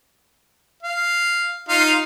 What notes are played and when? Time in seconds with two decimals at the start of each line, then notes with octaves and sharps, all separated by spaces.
0.83 F5
1.69 D#4 F4 F5